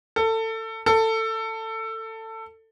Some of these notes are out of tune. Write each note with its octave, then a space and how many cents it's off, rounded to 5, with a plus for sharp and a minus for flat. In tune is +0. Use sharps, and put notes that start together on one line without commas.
A4 +25
A4 +20